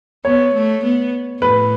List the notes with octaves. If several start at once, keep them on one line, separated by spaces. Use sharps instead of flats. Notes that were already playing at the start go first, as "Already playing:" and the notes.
B3 C#5
A3
B3
A2 B4